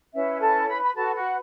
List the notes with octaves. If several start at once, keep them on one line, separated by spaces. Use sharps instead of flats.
C#4 E4 B4 E5
A4 A5
B4 B5
B5
F#4 A4 B4 A5
F#4 F#5